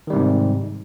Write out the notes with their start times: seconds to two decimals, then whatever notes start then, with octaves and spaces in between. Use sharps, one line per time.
0.07 D#3
0.10 G3
0.13 C3
0.16 G#2